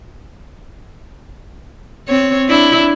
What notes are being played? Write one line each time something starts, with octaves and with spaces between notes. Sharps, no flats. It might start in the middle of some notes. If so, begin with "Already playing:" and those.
C4 C#5
D4 E4